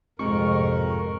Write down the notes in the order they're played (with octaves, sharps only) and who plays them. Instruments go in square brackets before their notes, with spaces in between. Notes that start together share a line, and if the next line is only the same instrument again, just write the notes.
[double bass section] A1 G#2 C3 [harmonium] F2 A#4 [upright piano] G#3 C4 [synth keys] C#6